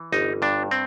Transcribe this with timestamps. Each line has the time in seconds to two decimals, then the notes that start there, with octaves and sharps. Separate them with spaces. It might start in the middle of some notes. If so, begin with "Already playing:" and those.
Already playing: E3
0.12 G1 D#4
0.42 G2 D4
0.71 C4